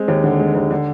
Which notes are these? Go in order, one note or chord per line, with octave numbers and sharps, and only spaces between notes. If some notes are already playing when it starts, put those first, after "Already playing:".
Already playing: G#3 C4
D#2
D3
G#3
D#2
D3